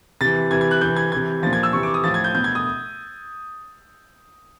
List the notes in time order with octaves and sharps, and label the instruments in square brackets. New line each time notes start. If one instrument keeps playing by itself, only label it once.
[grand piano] C3 E3 A6
C3 E3 G#6
G#6
F#6
C3 E3 G6
G#6
C3 E3 G#6
A#2 F3 A6
G#6
E6
C3 E3 C#6
D6
D#6
A2 F3 A6
G#6
G6
B2 G6
G#6
D#6